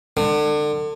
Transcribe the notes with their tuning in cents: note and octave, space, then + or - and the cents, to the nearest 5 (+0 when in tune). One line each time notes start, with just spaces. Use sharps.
D3 +30